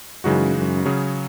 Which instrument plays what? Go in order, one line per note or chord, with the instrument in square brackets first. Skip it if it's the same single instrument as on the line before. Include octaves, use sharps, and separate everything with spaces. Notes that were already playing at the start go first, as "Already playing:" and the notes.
[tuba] F#2 [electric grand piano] C#3 E3 G#3 D#4 F#4
[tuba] F#2
[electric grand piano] C#3 F#3 C#4 G#4 C#5